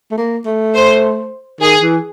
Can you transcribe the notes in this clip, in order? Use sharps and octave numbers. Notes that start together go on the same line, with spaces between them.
A3
A#3
A3
C5
D#3 G#4
E3